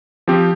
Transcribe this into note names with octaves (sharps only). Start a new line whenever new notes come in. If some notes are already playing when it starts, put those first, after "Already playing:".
F3 C4 G4